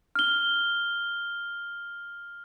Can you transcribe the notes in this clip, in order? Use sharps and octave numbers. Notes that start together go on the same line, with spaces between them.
F6 G7